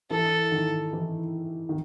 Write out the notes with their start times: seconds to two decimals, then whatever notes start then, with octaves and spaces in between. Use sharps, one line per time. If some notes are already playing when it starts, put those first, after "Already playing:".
0.10 E3 A4
0.52 D#3
0.93 E3
1.69 D#3